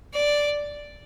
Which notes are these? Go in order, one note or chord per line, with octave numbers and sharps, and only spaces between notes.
D5